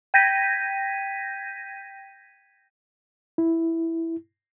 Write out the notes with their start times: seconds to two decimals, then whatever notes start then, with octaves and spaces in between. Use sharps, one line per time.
0.14 G5 G6 G#6 A#6 B6 D#7
3.38 E4